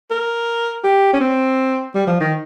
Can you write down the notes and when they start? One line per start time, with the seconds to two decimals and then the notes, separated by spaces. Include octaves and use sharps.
0.11 A#4
0.84 G4
1.13 C#4
1.20 C4
1.95 G3
2.07 F3
2.20 D#3